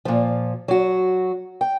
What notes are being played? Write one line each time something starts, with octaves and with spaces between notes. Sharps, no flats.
A#2 F3
F#3 F#4
G5